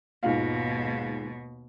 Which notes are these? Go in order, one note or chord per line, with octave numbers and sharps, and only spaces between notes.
D#2 G#2 B2 F4 F5